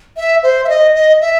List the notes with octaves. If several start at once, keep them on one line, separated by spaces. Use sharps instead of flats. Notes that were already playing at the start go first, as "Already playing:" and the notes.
E5
C5
E5
D#5
D#5
E5